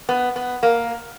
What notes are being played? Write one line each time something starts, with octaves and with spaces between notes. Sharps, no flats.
B3
B3
A#3